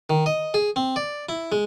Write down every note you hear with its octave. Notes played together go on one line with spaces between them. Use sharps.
D#3
D#5
G#4
C4
D5
E4
G#3